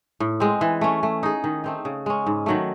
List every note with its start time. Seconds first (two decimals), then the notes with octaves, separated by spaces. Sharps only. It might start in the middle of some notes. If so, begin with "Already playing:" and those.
0.20 A2
0.40 G#3 C4
0.61 E3
0.81 A3 C#4
1.03 A3
1.23 D#4 G#4
1.44 D#3
1.64 A3 C4 D#4
1.85 C#3
2.06 G#3 C#4
2.26 G#2
2.46 D#3 F#3 A3